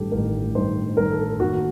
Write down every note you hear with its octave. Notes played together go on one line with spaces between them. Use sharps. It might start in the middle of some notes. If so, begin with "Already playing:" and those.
Already playing: A1 G2 D#3 G4 A4
A1 G2 D#3 A#4
A1 G2 D#3 C5
A1 G2 D#3 A#4
A4
D#2 D#3 F#4